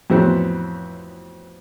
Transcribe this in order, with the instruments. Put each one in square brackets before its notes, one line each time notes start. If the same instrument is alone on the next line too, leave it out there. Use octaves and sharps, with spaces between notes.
[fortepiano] F2 A2 E3 F#3 B3 C4